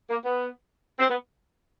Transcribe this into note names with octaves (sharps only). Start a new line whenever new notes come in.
A#3
B3
C4
B3